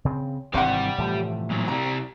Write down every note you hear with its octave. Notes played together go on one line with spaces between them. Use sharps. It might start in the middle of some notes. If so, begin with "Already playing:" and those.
C#3 C4
G#1 G2 C3 E3 C4 G4 D5 F#5
A2 E3 F3
A#2 F#3
C3 G3 A#5